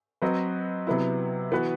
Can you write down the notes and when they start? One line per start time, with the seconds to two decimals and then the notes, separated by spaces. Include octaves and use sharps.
0.22 F#3 C4 F#4 B4 D#5
0.87 C3 F#3 B3 E4
1.52 E3 B3 F#4 B4